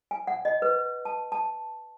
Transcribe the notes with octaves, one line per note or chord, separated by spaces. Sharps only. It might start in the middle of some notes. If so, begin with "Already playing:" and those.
G#5
F#5
D#5
B4
A5
A5